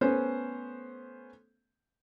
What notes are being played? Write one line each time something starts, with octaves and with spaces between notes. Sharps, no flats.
A3 B3 C#4 C5